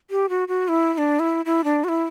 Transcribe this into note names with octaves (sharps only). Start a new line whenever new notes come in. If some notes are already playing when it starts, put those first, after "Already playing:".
G4
F#4
F#4
E4
E4
D4
E4
E4
D4
F#4
E4